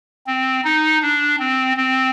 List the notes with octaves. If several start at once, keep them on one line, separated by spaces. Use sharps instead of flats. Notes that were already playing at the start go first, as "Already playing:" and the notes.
C4
D#4
D4
C4
C4